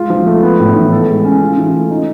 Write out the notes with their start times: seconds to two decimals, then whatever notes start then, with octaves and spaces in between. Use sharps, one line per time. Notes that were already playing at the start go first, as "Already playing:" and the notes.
Already playing: G#3 F4
0.10 F3
0.27 A3
0.43 B3
0.60 A2
0.76 E3
0.93 A4
1.08 G#3
1.25 C#4
1.41 F4
1.57 E3
1.74 A3
1.91 D#4